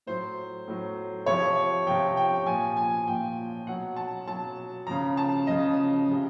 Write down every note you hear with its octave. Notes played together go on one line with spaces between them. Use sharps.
A2 F#3 C5
A2 F#3
C3 F3 C#5
C3 F3 G5
G5
A#2 F3 G#5
G#5
A#2 F3 G5
B2 F#3 F#5
A5
B2 F#3 A5
C#3 F3 A#5
A5
C#3 F3 D#5
C3 F3